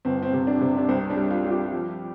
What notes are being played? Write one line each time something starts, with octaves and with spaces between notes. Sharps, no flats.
G1 C4
C4
C3
D4
C3
D4
C2 C4
D4
G3
F4
G3 F4
G4
F3